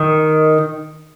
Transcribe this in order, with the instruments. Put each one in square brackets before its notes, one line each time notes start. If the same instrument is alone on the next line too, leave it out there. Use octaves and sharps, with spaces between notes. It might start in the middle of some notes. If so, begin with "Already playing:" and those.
Already playing: [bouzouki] D#3